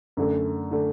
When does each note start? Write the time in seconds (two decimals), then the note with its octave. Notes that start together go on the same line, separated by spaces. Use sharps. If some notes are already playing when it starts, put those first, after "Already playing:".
0.17 F#2 D3 A3
0.71 D3 A3